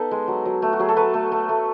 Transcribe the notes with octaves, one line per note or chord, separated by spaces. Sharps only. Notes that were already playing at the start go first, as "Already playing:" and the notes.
Already playing: B3 D#4 A4 B4
G#3
F#3
F#3
A3
F#4
F#3 G#4
A4
A3 B4
A3
A3
A3